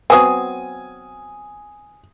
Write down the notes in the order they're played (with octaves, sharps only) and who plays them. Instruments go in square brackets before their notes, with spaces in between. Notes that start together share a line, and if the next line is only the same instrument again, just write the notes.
[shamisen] F#3 B3 C4 [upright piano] G#5 D#6